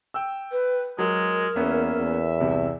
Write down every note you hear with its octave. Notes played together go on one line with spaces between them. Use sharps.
G5 E6
B4
F#3 G#3 A#4
E2 A#3 B3 C#4 E5
E2
C2 C3